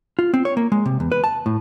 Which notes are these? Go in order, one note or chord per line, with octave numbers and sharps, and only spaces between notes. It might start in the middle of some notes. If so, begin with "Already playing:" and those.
F4
C4
C#5
A#3
G#3
C3
E2
B4
A5
A2